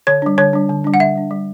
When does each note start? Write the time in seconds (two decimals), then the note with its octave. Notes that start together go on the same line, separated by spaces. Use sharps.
0.07 D3 C#5
0.22 G3 D4
0.38 D3 C#5
0.53 G3 D4
0.69 D3
0.84 G3 D4
0.94 F#5
1.00 D3 E5
1.16 G3 D4
1.31 G3